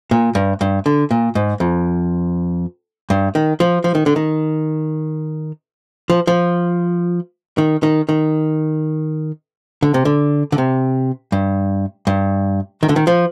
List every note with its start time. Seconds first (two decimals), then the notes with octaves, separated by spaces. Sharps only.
0.11 A#2
0.35 G2
0.61 G2
0.86 D3
1.11 A#2
1.35 G#2
1.60 F2
3.10 G2
3.35 D#3
3.60 F3
3.84 F3
3.95 D#3
4.06 D3
4.16 D#3
6.10 F3
6.27 F3
7.58 D#3
7.83 D#3
8.09 D#3
9.82 D3
9.94 C3
10.05 D3
10.52 D3
10.58 C3
11.32 G2
12.07 G2
12.83 D#3
12.89 D3
12.96 D#3
13.07 F3